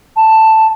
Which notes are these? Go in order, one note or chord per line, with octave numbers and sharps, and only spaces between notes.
A5